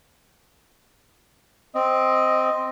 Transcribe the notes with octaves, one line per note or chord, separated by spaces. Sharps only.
C4 D#5